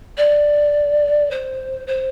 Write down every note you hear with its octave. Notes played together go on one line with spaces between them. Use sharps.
D5
C5
C5